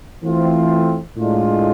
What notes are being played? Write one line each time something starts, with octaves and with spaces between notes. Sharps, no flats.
E3 A3 C4 F4
A2 G#3 D4 F4